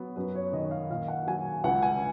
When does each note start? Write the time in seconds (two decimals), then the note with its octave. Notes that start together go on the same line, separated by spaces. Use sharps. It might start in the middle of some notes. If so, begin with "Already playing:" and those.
Already playing: F#3 B3
0.16 F#2 B4
0.35 C#5
0.53 D#3 D#5
0.71 F5
0.90 A#2 F5
1.08 F#5
1.27 F#3 G#5
1.64 C#2 F#5
1.82 G#5